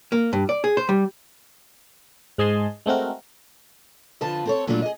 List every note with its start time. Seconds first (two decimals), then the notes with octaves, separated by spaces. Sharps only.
0.12 A#3
0.33 G2
0.49 D5
0.64 G#4
0.77 C5
0.89 G3
2.38 G#2 G#3 D#5 G#5 A5 C6
2.86 G#3 A3 C4 F#4 A#4
4.21 F2 D3 F4 B4 A5
4.45 C4 A4 C#5
4.67 A#2 F#3 G3 A3 D4 F4
4.82 G#4 D#5